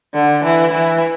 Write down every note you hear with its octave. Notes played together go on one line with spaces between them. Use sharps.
D3
E3
E3